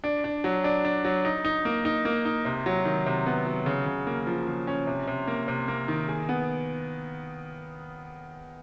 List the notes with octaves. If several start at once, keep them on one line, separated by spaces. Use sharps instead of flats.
D4
D4
F#3
D4
D4
F#3
D#4
D#4
A#3
D#4
A#3
D#4
C3
F#3
D#3
C3
B3
F#3
C#3
C#3
A#3
F3
C#3
C#4
C3
C3
A#3
C3
A#3
D#3
G#4
B3